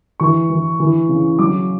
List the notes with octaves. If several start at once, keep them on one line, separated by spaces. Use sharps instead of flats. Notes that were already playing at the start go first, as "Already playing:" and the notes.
E3 C#6
E3
E3
C#3
F#3 D6